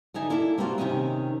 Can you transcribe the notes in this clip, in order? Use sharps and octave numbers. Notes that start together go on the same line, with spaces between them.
D3 D#4 E5 G#5
A#3 E4 A4 D5 E5
G3 A#3 C4 C#4 F4 F#4
C3 D#3 F3 C#4 D#5 E5